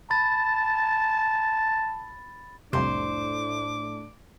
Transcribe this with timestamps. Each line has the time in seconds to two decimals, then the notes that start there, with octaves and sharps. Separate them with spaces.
0.10 A5 B5 A6
2.73 C2 F2 A2 C3 A3 D4 C5 D6